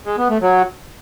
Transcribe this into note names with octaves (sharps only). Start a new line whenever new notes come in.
G#3
B3
A3
F#3